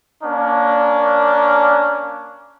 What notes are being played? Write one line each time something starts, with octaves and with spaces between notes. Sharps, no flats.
A#3 C#4 D4